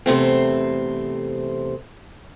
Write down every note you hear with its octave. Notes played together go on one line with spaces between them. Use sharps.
E2 C3 A3 C4